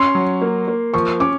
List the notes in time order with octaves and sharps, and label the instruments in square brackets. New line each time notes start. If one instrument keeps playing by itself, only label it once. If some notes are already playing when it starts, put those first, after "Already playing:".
Already playing: [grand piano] C#4 [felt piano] C6
[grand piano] F#3
A#3
A#3
[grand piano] F3 [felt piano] C#6
[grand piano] C#4 [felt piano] D6